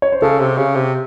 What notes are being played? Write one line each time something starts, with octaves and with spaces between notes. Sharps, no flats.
C#5
C5
C#3 A4
C3
C#3
C3